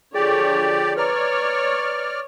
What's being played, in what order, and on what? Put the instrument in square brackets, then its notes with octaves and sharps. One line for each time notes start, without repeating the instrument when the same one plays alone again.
[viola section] D3 F3 C#5 [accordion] G4 D5 [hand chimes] G#4
[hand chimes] B4 A#5 [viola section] C#5 [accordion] D5 F6